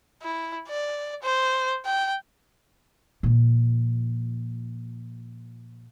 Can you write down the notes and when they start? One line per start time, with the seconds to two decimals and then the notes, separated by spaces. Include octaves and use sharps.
0.22 E4
0.69 D5
1.23 C5
1.86 G5
3.23 A#2 F3